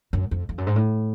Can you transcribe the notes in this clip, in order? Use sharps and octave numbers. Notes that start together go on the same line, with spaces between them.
F#2
F2
F2
F#2
G#2
A2